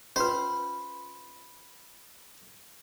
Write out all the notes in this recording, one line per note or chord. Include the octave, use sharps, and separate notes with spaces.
C#4 F4 B4 C5 B5